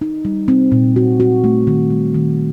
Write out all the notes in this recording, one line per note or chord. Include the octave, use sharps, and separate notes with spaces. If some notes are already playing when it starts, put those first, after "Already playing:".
D#4
G3
C4
A#2
F#4
F#4
A3
D#3
G3
D#3